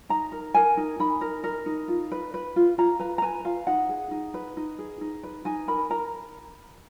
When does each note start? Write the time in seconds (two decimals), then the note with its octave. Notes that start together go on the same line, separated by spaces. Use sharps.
0.09 D#4 A#5
0.32 A#4
0.54 A#4 G#5
0.77 D#4
1.00 D#4 B5
1.21 A#4
1.44 A#4
1.66 D#4
1.88 F4
2.12 B4
2.34 B4
2.56 F4
2.78 F4 A#5
2.99 B4 A#5
3.18 A#5
3.22 B4 G#5
3.45 F4 F5
3.67 D#4 F#5
3.89 G#4
4.11 D#4
4.34 B4
4.57 D#4
4.78 G#4
5.01 D#4
5.23 B4
5.45 D#4 G#5
5.68 A#4 B5
5.90 A#4 A#5